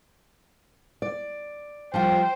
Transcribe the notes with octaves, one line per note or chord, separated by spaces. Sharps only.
D5
F3 G3 F4 C5 G5